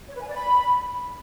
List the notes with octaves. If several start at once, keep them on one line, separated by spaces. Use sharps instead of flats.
C#5
B4
G#5
D5
B5